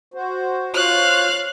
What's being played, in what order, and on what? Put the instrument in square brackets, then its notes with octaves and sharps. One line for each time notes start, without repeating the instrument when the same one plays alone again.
[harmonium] F#4 C5
[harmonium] F4 C5 C#5 [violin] F5 F#6